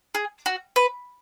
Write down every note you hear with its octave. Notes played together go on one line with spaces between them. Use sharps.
G#4
F#4
B4